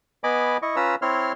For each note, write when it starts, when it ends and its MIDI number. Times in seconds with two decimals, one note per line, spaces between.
0.24 0.57 59
0.24 0.57 75
0.24 0.57 80
0.24 0.57 83
0.24 0.57 86
0.62 0.76 64
0.62 0.76 75
0.62 0.76 85
0.76 0.95 61
0.76 0.95 65
0.76 0.95 71
0.76 0.95 82
0.76 0.95 88
1.02 1.32 60
1.02 1.32 64
1.02 1.32 73
1.02 1.32 84
1.02 1.32 89